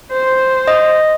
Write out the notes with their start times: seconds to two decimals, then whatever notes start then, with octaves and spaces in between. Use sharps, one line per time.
0.11 C5
0.68 D#5